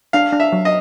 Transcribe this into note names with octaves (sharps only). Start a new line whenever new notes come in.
D4 F5
D4
E5
F#3
D#5